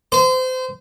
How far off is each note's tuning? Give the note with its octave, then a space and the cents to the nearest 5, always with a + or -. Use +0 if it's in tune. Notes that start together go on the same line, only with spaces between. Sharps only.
C5 -30